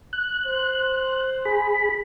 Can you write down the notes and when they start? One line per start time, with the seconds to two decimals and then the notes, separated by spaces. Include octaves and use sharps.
0.13 F#6
0.45 C5
1.45 G#4 B5